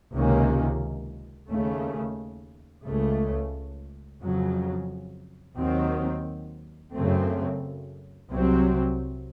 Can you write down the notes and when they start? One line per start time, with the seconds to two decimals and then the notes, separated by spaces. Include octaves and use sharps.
0.12 C#2 C3 D#3 A#3 C#4
1.49 D#2 C#3 A3
2.85 C#2 C#3 A3
4.21 F2 C#3 F#3
5.57 D#2 D#3 F#3 C4
6.93 F#2 C#3 A3 C4
8.30 C2 C3 F#3 C4